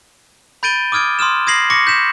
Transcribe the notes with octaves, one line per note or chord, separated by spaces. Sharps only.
B5 G6 A6 D7 D#7 G7
D6 D#6 F6 G#6 D7
C6 D#6 F6 E7
D#6 G#6 A#6 C7 F#7
C#6 D6 A#6 C#7
G6 B6 E7